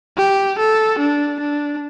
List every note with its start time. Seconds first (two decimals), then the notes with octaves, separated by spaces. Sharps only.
0.18 G4
0.59 A4
0.99 D4
1.40 D4